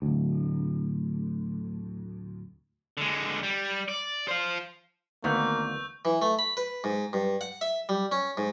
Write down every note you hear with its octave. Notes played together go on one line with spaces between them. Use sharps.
D1 D2
D3 G#3
G3
D5
C5 F5
D2 D#3 A#3 B3 C#6 E6 G6
E3
A3
B5
B4
G#2
G2
F#5
E5
G3
C#4
G#2